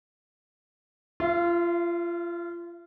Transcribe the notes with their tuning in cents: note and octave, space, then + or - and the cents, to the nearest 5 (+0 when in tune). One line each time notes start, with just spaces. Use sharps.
F4 -25 E5 +35